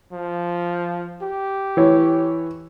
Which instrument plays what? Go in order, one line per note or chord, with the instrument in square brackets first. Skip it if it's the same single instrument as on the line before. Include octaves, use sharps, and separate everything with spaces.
[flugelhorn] F3
G4
[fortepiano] E3 C#5